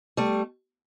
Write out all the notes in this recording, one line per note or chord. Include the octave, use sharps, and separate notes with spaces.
G3 A3